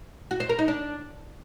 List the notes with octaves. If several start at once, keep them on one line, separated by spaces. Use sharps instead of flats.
F#4
C5
A#4
D#4
D4